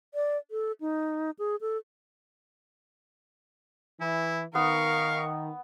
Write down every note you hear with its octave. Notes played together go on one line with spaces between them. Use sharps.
D5
A4
D#4
G#4
A4
E3 E4
D#3 B3 A#4 F5 C#6